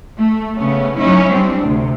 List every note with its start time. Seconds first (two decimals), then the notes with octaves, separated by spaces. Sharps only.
0.17 A3
0.56 C#3 A3 B3 C#4
0.98 F#3 C#4 D#4 E4
1.31 G3 C4 D4
1.65 D2 C3